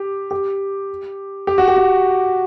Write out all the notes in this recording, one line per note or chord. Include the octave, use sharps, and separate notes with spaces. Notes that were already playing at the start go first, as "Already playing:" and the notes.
Already playing: G4
G4
G4
F#4
G4
F#4